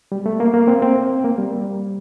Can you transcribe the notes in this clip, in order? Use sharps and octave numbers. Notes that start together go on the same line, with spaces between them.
G3
A3
A#3
A#3
C4
C4
A#3
G3